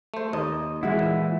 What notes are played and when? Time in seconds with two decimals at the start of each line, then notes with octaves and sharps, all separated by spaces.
0.14 A3 C5
0.33 D#2 D#5
0.83 E3 G#3 E4 F#4
0.99 A#2